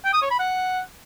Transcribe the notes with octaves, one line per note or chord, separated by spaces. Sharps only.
G5
D#6
C#5
B5
F#5